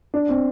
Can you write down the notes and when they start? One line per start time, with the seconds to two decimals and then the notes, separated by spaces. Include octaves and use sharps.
0.14 D4
0.29 C4